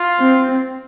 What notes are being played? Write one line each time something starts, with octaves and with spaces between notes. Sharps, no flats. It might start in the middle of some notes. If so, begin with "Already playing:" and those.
Already playing: F4
C4